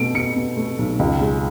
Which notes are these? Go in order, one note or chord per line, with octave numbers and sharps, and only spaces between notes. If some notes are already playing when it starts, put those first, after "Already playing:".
Already playing: B2 A3 D7
B2 C#7
B2
A3
B1
C#2
G#3